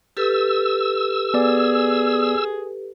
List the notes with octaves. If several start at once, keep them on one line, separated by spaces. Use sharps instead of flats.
G4 A4 B4 E6
B3 G#4 D5